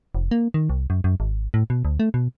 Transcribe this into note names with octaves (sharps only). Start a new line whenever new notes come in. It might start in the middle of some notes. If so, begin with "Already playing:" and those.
F1
A#3
D#3
C2
F#2
F#2
G#1
A2
B2
D2
A3
B2